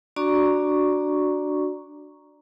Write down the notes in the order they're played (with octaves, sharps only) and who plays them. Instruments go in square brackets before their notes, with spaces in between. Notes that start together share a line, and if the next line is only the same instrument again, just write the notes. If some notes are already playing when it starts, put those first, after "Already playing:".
[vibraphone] D4 F#4 D5 A#5 C#6